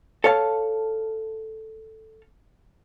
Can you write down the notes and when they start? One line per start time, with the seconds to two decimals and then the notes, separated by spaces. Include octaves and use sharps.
0.24 A4 C#5 F5 A5